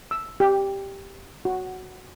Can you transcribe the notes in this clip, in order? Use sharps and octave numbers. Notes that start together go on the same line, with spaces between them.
E6
G4
F#4